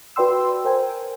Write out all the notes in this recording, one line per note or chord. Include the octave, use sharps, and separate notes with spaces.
F#4 B4 D5 G5 C6 E6
A#4 C5 G5 G#5